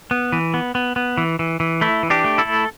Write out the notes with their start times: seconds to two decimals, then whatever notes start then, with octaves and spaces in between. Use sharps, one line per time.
0.11 B3
0.32 E3
0.54 B3
0.75 B3
0.96 B3
1.17 E3
1.39 E3
1.60 E3
1.81 A3 E4
2.03 E3
2.10 D4 G4
2.24 A3
2.38 E4 A4
2.45 A3